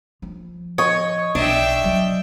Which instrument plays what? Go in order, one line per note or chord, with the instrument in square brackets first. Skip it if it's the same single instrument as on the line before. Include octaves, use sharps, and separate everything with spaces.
[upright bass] F3
[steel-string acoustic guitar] C#5 [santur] D#5 C#6
[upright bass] B1 [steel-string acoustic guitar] D4 [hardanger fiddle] E5 G5
[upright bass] F#3